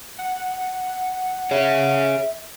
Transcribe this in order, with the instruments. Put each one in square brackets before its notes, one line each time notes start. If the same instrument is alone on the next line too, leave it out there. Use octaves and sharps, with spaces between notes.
[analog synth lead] F#5
[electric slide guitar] G#4 C#5 [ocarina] E5